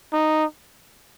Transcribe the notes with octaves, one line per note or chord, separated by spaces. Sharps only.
D#4